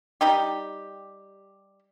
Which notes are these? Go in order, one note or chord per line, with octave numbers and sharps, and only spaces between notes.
G3 D#4 G4